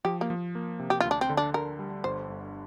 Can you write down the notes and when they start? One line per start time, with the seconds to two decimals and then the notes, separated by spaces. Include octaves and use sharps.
0.05 F3 G4
0.21 A#3
0.30 F3
0.55 A#3
0.79 C3
0.90 G4
1.00 D2 F4
1.11 D4
1.21 C4
1.29 D3
1.37 D4
1.54 D3 A#4
1.79 G3
2.04 G1 C5
2.29 G1